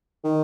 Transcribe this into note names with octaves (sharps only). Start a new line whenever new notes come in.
D#3